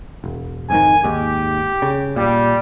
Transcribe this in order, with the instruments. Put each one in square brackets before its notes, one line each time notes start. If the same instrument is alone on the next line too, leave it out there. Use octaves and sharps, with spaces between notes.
[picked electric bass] E1
[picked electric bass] F2 G#2 D#3 [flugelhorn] G#5
[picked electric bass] D#2 G#2 [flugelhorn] G4
[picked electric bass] C#3
[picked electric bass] A#2 [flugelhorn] G3